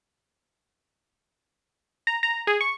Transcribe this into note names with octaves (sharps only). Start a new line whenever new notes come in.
A#5
A#5
G#4
C#6